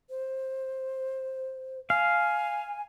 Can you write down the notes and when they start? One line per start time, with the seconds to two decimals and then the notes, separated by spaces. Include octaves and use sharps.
0.10 C5
1.90 F5 G#5